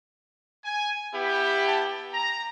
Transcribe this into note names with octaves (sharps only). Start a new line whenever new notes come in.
G#5
B3 E4 G4
A5
A#5